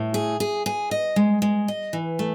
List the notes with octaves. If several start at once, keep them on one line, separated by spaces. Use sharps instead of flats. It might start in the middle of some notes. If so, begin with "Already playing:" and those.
Already playing: A2
G#4
G#4
G#4
D#5
G#3
G#3
D#5
E3
A3